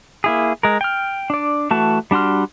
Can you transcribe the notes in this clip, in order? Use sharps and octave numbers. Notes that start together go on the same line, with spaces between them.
A#3 E4 G#4
G#3 A#4
G5 F6
D4 D5
E3 A3 F#4 A5
G3 D4 F#4 C6 F6